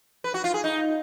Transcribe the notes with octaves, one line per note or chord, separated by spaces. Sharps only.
B4
F#4
F4
G#4
D#4